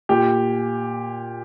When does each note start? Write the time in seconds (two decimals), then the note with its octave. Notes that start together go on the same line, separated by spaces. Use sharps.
0.09 A#2 G4